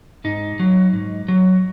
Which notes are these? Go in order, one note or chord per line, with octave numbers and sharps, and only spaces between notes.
G#2 D#4
F#3
G#2
F#3